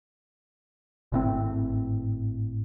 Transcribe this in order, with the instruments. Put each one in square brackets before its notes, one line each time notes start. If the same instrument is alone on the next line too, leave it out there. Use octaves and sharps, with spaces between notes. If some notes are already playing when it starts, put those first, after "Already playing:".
[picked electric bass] G#1 A2 C4